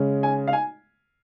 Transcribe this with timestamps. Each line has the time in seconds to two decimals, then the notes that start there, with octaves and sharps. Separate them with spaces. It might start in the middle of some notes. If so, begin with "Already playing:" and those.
Already playing: C#3 G#3 C#4
0.23 G#5
0.48 F5
0.53 G#5